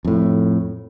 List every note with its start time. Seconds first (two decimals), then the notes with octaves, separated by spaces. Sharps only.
0.05 F2 A2